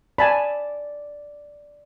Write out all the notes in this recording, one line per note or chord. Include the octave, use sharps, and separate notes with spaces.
D5 G#5 A5 B5